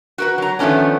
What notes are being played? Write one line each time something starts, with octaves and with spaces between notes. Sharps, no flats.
F#4 A#4 B4
F#3 A#5
D#3 F3 A3 B3 C#4 D4